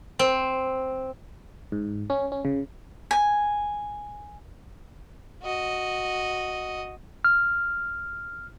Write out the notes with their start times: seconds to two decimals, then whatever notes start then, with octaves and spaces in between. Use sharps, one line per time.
0.19 C4
1.72 G#2
2.10 C#4
2.32 C#4
2.45 C#3
3.11 G#5
5.43 F#4 D#5
7.25 F6